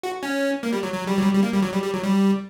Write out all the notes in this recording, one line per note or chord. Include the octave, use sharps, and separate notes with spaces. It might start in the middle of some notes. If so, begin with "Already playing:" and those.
F#4
C#4
A#3
G3
F#3
F#3
G3
F#3
G3
G3
A#3
G3
F#3
G3
G3
F#3
G3